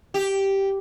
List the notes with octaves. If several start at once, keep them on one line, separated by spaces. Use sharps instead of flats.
G4